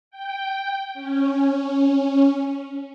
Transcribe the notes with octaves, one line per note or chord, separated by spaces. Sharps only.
G5
C#4